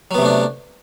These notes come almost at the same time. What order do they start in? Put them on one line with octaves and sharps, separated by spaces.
F#3 B3 C3 A3 D4